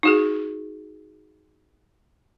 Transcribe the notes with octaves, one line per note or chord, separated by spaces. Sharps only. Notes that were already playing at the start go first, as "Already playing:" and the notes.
D#4 F#4 G#4